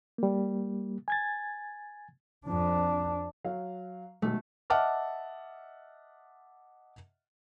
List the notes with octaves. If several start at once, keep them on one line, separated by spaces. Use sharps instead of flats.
G3 A#3
G#5 G#6 A6
F2 D4
F#3 F5
D#1 B1 B2 A3
D#5 E5 F#5 A5 D6 F6